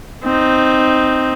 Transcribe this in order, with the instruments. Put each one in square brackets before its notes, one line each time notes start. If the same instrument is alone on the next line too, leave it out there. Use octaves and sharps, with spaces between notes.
[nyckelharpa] C4 D#4